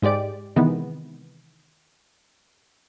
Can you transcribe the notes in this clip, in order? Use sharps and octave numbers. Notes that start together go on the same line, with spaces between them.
G#2 G#3 G4 D5 D7
C3 D#3 E3 G#3 B3